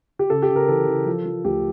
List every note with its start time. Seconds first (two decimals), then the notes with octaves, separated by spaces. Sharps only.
0.19 G4
0.30 C#3 A4
0.42 G4
0.49 C#3
0.56 A#4
0.68 E3 A4
0.87 E3
1.06 F3
1.25 F3
1.45 D2 G4